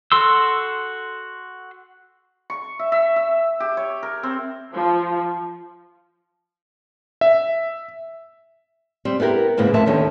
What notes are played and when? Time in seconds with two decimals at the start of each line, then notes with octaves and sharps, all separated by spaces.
0.12 F#4 A4 C6 E6
2.50 C#6
2.79 E5
2.92 E5
3.16 E5
3.60 G4
3.77 C#5
4.03 A#4
4.23 C4
4.73 F3
7.21 E5
9.05 G3 C4
9.20 B3 E4 G4 A#4
9.57 G#2 C#3 E3 A#3 B3
9.74 F2 F3 A3 E5 A5
9.86 D#2 D3 D#3 C#4